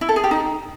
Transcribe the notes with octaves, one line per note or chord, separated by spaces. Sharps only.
E4
A4
G#4
G4
D#4